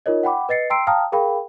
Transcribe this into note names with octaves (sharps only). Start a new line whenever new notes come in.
D#4 F4 A#4 C#5 D#5
F#5 G5 B5 D6
B4 D#5 A6 C7 C#7
G5 A#5 C6 E6 C7 D7
F5 G5 A5 A#5 D#6 F6
G#4 A#4 F5 G5 B5